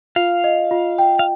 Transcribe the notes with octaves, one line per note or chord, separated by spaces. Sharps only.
F4 F5
D#5
F4
G5
F5